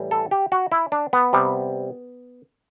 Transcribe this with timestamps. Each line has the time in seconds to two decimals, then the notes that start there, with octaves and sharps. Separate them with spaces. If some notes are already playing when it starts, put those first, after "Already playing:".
Already playing: A2 E3 G3
0.11 A4
0.31 G4
0.52 F#4
0.72 E4
0.92 D4
1.13 B3
1.33 C3 G3